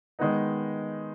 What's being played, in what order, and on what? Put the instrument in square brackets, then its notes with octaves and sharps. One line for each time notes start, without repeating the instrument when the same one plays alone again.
[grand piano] D#3 G#3 B3 D#4